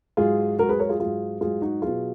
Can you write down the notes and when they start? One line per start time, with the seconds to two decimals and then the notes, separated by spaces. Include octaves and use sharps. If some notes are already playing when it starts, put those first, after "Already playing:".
0.17 G#2 F#3 F4 G#4
0.59 G#2 F#3 F#4 A#4
0.69 G#4 B4
0.79 A#4 C#5
0.89 F4 G#4
1.00 G#2 F#3 F4 G#4
1.41 G#2 F#3 F4 G#4
1.62 D#4 F#4
1.82 B2 F#3 F4 G#4